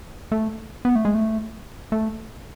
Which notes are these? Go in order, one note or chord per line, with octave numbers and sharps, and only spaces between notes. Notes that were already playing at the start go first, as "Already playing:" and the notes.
A3
B3
A3
G#3
A3
A3